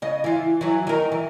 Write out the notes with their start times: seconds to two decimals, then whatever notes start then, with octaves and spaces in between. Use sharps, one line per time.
0.02 C#3 D#5
0.24 E3 F4
0.61 E3 F#3
0.87 D#3 A#4
1.12 E3